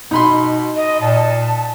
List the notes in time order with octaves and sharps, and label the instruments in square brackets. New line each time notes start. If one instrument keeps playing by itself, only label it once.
[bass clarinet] B2 [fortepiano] D#4 B5 C6
[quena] D#5
[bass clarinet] A#2 [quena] A5